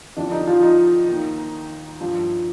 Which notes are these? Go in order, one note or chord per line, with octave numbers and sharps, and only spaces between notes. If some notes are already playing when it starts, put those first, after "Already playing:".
F2 D3 F3 D4
D#4
F3 F4
D#4
D#2 D#3
G2 F3